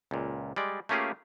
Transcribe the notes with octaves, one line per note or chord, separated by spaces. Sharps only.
C#2 A#2
G3 G#3 D5
A3 A#3 C#4 F4 G4 G#4